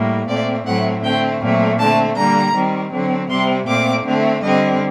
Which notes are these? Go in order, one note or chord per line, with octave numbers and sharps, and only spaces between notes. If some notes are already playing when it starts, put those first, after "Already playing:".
Already playing: A2 G3 A#3
A#2 A3 C4 D5
A2 F#3 A3 C4 F#5
D3 A3 C4 G5
A#2 F#3 A3 C4
D3 A3 C4 A5
D3 G3 A#3 A#5
D#3 G3 C4
D3 F#3 C4
C3 G3 C4 C6
A#2 A3 C4 D6
D3 A3 C4
D3 G3 C4 D#5